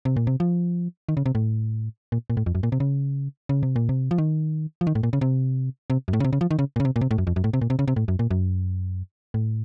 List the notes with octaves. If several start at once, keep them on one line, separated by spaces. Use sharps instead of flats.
C3
A#2
C3
F3
D#3
C#3
C3
A2
A#2
A#2
A2
F2
F#2
A#2
C3
C#3
C#3
C3
A#2
C3
F3
D#3
F3
D#3
A2
A#2
C#3
C3
C3
F#2
A2
C#3
C3
C#3
F3
D#3
C#3
A#2
C#3
C3
A#2
C3
A2
F#2
F2
F#2
A2
C3
A#2
C3
C#3
C3
A2
F#2
A#2
F#2
A2